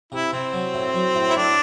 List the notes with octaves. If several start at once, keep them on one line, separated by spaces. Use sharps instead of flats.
C3 E4
C3 C4
F#3
A2
F#3
A2
E4
A2 D4